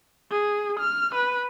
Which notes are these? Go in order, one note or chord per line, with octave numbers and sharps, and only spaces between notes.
G#4
F6
B4